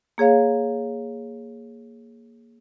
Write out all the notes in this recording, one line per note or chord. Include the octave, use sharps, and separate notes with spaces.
A#3 G#4 C#5 F5